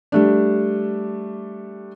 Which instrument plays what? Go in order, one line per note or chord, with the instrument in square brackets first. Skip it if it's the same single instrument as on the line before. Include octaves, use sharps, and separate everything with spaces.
[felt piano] G3 A3 D4